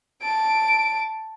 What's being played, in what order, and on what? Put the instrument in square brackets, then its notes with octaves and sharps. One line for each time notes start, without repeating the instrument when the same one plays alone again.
[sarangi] A5 [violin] D7